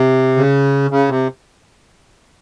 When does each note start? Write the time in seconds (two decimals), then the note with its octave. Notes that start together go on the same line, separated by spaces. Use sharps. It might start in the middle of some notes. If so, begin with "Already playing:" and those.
Already playing: C3
0.37 C#3
0.91 C#3
1.09 C3